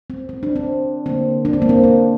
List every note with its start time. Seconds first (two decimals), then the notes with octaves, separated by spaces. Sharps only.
0.10 C4
0.29 C4
0.43 D4
0.56 C4
1.06 D3 A#3 C4
1.45 D4
1.53 C4
1.62 A#3
1.69 C4
1.84 C4